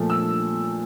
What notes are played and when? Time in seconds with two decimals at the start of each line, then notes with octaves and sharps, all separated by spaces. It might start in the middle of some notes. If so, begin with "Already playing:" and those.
Already playing: A#2 F3 A3
0.10 E6